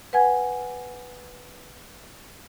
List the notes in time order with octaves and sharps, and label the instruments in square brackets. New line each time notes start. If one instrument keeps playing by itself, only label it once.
[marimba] B4 F#5 G#5 G#6